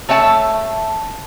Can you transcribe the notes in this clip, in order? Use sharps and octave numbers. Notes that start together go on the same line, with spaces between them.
A3 C#5 E5 F#5 A5